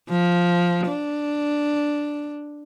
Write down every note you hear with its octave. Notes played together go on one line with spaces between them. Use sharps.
F3
D4